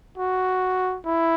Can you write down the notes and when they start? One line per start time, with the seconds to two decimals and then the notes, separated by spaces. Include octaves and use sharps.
0.18 F#4
1.06 E4